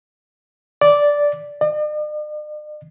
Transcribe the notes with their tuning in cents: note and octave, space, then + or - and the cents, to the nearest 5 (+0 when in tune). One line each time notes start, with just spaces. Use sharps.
D5 -10
D5 +45